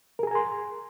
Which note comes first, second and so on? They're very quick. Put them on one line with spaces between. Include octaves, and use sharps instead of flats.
A#4 G#4 A#5 G#5 C6